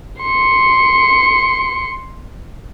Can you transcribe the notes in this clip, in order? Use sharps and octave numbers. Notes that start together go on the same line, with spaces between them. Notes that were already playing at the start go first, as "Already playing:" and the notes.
C6 C#7